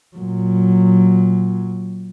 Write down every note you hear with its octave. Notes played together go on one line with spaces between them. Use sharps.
A#2 F#3